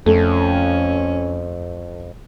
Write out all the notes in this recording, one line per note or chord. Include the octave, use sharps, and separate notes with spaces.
F2 A3 C#4